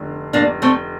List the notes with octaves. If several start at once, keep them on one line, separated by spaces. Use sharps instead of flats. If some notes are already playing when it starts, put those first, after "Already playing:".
Already playing: F1 D3
F1 A#3 D4
A3 C4